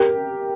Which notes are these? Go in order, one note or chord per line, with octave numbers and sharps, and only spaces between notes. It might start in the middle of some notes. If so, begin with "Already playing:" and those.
Already playing: G4 A#4